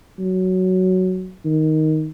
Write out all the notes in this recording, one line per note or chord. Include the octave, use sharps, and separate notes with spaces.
F#3
D#3